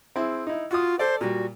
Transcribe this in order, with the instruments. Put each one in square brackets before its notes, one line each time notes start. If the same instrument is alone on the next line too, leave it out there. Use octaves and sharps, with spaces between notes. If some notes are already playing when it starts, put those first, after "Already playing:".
[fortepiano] C4 E4 G#4
D#4 E4
[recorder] F4 [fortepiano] F#4 D#6
[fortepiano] A4 D5 [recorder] C5
[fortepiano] A#2 G3 [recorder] F#4